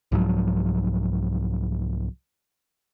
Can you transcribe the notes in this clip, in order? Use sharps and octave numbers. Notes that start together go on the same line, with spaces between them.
C2 G#2 F3 F#3